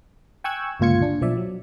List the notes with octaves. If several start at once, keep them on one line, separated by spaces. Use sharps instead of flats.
G5 G#5 C#6 E6 F#6 G#6
G1 C#2 A#2 F4 G#6 C#7
D4
B1 F3 D5 E5
F#3